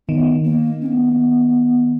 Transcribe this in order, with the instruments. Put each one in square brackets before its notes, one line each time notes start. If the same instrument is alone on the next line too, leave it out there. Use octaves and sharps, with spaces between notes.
[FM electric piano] D#3 [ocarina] B3
[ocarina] A#3
C#4
B3